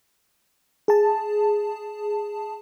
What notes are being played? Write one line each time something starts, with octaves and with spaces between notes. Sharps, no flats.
G#4 A5